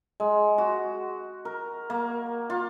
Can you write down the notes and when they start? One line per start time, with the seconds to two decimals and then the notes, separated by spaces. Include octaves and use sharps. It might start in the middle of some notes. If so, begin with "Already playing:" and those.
0.20 G#3
0.58 F#4
1.45 A#4
1.90 A#3
2.50 F4